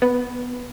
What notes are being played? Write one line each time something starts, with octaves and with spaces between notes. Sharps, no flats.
B3